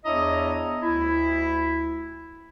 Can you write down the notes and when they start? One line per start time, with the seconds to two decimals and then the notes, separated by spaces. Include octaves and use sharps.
0.05 E2 D4 E4 C#5 D#5 A#5
0.83 D2 E4